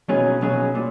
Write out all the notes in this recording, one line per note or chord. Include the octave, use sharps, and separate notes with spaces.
B1 B2 F#3 C#4 G#4
B1 B2 F#3 C#4 G#4
A#2